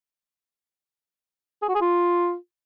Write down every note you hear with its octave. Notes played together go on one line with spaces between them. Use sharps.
G#4
F#4
G#4
F4